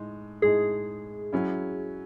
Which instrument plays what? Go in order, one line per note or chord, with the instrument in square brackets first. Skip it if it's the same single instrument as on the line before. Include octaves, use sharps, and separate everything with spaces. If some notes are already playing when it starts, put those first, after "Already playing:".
Already playing: [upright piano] A2 G#3 D#4
[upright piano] A2 G#3 D#4 [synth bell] G#4
[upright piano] F#3 C#4 E4